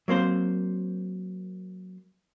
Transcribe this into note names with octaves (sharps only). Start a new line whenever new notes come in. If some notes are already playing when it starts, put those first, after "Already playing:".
F#3 A#3 C4 C5